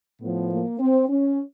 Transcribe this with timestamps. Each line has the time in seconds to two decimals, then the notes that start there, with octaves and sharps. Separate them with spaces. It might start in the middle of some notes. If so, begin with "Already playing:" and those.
0.20 A2 F3 B3
0.51 A#3
0.79 C4
1.09 C#4